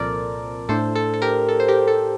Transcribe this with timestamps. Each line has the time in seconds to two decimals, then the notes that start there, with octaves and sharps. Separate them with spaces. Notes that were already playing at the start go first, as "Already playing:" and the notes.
Already playing: C2 A#2 F3 C4 A4 A#4 C5 D5
0.69 A2 A3 D4 A4 C5
0.95 A4
1.14 A4
1.22 G4 A#4
1.49 A4
1.60 C5
1.68 G4 A#4
1.88 A4